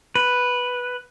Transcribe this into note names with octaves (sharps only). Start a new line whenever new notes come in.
B4